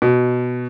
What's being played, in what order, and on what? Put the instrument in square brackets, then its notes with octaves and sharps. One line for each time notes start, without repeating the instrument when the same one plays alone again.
[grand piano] B2